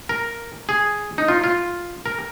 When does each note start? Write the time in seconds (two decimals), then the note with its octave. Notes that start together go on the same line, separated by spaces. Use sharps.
0.09 A#4
0.69 G#4
1.18 D#4
1.28 F4
1.44 F4
2.06 A#4